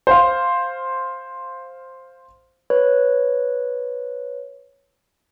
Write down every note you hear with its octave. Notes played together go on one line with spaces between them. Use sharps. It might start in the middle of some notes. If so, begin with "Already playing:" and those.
C5 F5
B4 C#5